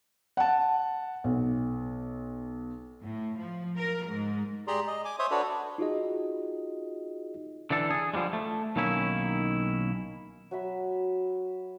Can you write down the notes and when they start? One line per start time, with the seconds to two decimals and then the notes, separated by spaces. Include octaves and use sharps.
0.37 F#5 A5
1.24 B1
3.03 A2
3.38 F3
3.78 A#4
4.08 G#2
4.68 G4 G#4 D5 A#5 C6
4.87 D#5
5.05 G#5 D6
5.19 C5 C#5 E5 C6 D#6
5.31 D4 F#4 A4 B4 C#5 D5
5.78 D#4 F4 F#4 G#4 D#5
7.70 D3 E3 D4 A4
7.91 G#4
8.14 D3 F3 G3 G#3
8.33 A3
8.76 B1 D#3 A#3 C#4 E4
10.51 F#3 F#4 E5 B5